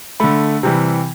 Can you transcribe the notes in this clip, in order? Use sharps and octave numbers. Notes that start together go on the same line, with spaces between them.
D3 A3 B5
C3 E3 G3